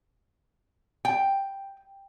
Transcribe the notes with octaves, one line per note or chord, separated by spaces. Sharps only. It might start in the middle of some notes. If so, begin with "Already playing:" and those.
G5